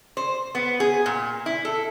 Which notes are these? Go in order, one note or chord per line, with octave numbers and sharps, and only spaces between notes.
C5
B3
G#4
A#2
E4
A4